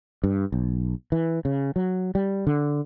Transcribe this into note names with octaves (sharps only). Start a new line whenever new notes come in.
G2
B1
E3
C#3
F#3
G3
D3